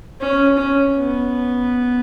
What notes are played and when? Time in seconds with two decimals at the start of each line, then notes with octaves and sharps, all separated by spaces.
0.21 C#4
0.58 C#4
0.96 B3